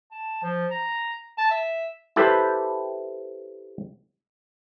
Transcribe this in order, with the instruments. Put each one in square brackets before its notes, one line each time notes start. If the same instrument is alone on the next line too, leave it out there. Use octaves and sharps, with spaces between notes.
[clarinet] A5
F3
A#5
A5
E5
[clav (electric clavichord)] E4 G4 A4 B4 C5